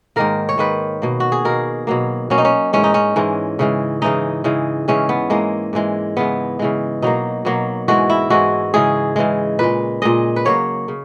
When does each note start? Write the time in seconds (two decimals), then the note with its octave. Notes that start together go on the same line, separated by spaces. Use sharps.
0.16 G#2 D#3 A#3 A#4
0.49 C#5
0.58 G#2 D#3 A#3 B4
1.02 B2 A#3
1.20 F#4
1.32 G#4
1.45 B2 A#3 A#4
1.87 B2 F#3 A#3
2.30 B2 F#3 A#3 C#4
2.38 D#4
2.45 C#4
2.73 G#2 E3 G#3 C#4
2.84 D#4
2.94 C#4
3.16 G#2 E3 G#3
3.59 C#3 E3 G#3
4.02 C#3 E3 G#3 D#4
4.44 C#3 E3 G#3
4.88 C#3 E3 G#3 C#4
5.09 B3
5.30 G#2 E3 G#3 A#3
5.73 G#2 E3 G#3
6.17 C#3 E3 G#3 B3
6.59 C#3 E3 G#3
7.02 B2 F#3 A#3 D#4
7.45 B2 F#3 A#3
7.88 G#2 E3 G#3 F#4
8.10 E4
8.30 G#2 E3 G#3 F#4
8.74 C#3 E3 G#3 G#4
9.16 C#3 E3 G#3
9.59 A#2 G#3 B4
10.02 A#2 G#3 D#5
10.36 B4
10.45 C#3 F#3 A#3 C#5
10.88 C#3